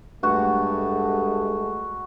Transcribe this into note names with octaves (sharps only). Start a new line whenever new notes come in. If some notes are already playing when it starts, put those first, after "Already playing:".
G2 G#3 A3 F#4